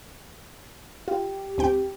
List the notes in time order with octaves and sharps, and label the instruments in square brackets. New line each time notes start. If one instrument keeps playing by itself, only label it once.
[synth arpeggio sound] F4 [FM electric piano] G4
[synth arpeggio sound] D2 C4 G5